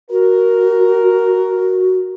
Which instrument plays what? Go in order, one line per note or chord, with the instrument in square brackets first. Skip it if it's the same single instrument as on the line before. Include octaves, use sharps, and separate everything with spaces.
[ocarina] F#4 [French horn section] A#4